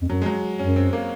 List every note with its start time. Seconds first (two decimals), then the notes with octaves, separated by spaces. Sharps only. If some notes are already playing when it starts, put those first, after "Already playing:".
0.02 F2
0.08 F#2 F#3
0.22 G#3
0.26 F#3
0.59 F#2 C#4
0.76 C4
0.93 A#3